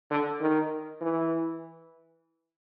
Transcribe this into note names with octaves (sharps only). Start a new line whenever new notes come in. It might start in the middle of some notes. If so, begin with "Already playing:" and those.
D3
D#3
E3